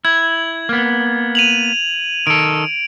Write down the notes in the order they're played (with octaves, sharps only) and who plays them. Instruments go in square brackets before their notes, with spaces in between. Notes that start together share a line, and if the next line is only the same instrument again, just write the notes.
[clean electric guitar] E4 [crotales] G#6
[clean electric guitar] A#3 B3
[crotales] D#7 F7 F#7
[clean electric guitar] D#3 A4 [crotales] D7